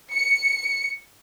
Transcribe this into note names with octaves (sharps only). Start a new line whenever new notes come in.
C#7